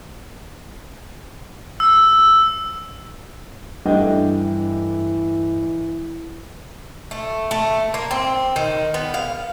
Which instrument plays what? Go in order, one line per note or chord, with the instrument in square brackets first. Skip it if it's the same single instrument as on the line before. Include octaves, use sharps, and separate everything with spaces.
[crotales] E6
[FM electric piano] G2 A3 [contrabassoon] E3 [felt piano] D4 D#5 G5
[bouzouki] A3
A3
A#3
C4
D#3
B3
F5